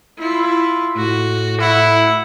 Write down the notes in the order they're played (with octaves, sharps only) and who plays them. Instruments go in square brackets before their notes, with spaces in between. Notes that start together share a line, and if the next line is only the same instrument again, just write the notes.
[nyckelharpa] E4 F4
[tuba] A2 [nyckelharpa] F#4
[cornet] E4 [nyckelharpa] F#5